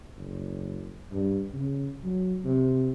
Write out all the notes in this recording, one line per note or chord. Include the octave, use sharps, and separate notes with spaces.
F#1
G2
C#3
F#3
C3